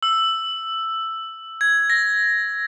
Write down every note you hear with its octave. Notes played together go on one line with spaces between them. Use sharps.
E6
G#6
A#6